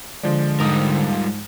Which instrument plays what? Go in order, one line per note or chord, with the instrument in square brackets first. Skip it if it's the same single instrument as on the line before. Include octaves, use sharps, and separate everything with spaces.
[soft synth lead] D3 [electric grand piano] F3 G#3 [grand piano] D5
[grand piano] G#2 D#6 [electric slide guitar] G3 D#4 A#4